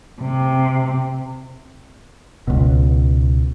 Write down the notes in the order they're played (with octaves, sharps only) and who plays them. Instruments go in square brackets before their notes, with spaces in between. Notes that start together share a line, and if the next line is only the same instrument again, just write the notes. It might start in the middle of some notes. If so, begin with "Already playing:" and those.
[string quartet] C3
[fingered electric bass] C#2 B2